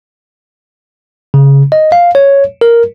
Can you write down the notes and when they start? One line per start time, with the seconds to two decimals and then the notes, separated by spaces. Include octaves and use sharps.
1.34 C#3
1.72 D#5
1.92 F5
2.15 C#5
2.61 A#4